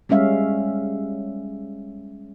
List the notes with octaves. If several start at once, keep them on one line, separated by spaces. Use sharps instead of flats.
G3 G#3 C#4 E5 F5